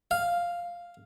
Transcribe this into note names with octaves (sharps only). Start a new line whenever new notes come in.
F5